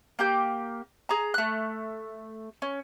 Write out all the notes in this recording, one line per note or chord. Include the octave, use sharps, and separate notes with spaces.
A#3 G4 G6
G#4 A#5
A3 F#6
C#4